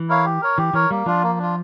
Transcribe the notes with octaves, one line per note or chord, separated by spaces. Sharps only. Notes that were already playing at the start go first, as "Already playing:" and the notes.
Already playing: E3
E4 A#4 C#5 F5
G4
A#4 C#5
E3 G4
E3 A#4 C#5
G3 A#3
F3 D4 F4
A#3
D4 F4